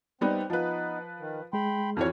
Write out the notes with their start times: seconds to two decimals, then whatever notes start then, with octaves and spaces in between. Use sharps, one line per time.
0.21 G3 B3 C4 D#4
0.50 F3 B3 D#4 B4
1.19 D#3
1.53 G#3 G#4 G5 B5 C6
1.97 F2 E3 C4 F#4 C#5 F6